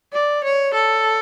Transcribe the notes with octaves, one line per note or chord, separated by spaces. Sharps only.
D5
C#5
A4